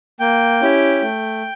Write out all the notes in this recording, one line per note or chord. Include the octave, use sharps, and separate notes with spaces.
A#3 G5
C#4 E4 G4
A3